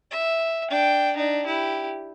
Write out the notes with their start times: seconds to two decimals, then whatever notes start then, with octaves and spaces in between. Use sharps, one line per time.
0.11 E5
0.70 D4 G5
1.17 D4 D#4
1.45 E4 G4